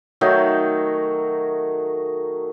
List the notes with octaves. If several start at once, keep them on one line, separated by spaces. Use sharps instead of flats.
D#3 F#3 A3 D#4